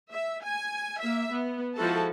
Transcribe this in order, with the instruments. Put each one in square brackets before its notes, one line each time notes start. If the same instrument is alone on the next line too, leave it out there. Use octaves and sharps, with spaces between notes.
[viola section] E5
G#5
A#3 E5
B3
F3 G#3 E4 F#4 A4 A5